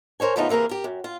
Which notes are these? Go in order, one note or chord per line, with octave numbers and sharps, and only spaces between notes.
A#4 C5 C#5 G#5
C#3 F3 A3 B3 D#4 F4
C3 E3 A#3 G#4 A#4
G4 A#4
F#2
F4